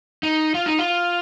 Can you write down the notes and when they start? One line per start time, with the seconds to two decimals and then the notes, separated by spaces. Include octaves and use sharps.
0.23 D#4
0.54 F4
0.66 D#4
0.79 F4